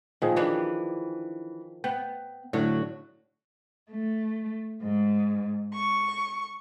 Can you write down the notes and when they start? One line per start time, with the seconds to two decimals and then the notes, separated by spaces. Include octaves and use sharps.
0.22 A#2 D#3 F3 G#4
0.36 E3 D4 G4
1.84 B3 G5
2.53 A2 D3 F#3
3.91 A3
4.82 G#2
5.74 C#6